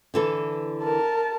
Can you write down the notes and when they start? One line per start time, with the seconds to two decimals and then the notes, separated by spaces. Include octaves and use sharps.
0.14 D3 E3 A4
0.82 A#4 A5